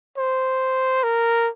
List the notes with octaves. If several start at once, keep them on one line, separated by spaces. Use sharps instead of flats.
C5
A#4